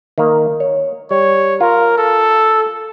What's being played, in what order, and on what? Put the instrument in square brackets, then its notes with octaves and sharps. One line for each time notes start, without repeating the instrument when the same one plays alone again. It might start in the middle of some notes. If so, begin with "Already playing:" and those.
[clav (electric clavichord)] D#3 A#3
C#5
[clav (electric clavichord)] G3 [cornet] C#5
[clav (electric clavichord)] F4 [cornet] A#4
[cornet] A4